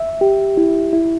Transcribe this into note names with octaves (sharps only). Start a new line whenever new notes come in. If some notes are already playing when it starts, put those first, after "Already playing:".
Already playing: E5
G4
E4
E4